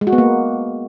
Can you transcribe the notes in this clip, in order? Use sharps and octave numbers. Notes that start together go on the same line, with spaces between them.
G#3
F#4
B3
A#3